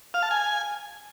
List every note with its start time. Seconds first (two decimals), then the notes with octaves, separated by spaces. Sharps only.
0.14 F5
0.22 A5
0.31 G#5